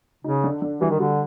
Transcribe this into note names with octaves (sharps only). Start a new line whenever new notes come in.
C#3 D#4
D3
D3
E3 G3
D#3
D3 G3